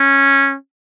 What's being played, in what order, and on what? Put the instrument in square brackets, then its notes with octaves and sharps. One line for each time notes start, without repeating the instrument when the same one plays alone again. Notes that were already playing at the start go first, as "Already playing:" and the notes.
Already playing: [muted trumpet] C#4